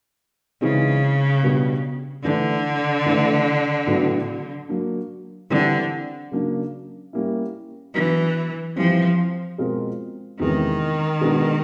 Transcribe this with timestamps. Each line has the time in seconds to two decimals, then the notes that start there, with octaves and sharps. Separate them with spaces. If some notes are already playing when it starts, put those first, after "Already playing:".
0.61 C#3 E3 G#3 C4 D#4
1.43 B2 G3 B3 D4
2.24 D3 E3 A3 D4
3.06 E3 A3 D4
3.87 A2 F#3 B3 D4 F#4
4.69 F#3 A#3 D4
5.50 D3 E3 G3 C4 E4 G4
6.31 C#3 F#3 A#3 D4
7.13 G3 A#3 C#4 E4
7.94 E3 F#3 B3 D4
8.76 E3 F3 G3 C4
9.58 B2 G#3 C4 F4 A#4
10.40 E2 C3 D#3 E3 G#3 C#4
11.21 B2 G#3 B3 D4 F#4